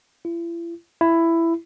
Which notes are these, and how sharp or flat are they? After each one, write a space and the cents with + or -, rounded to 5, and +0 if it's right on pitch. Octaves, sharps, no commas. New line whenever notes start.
E4 +40
E4 +10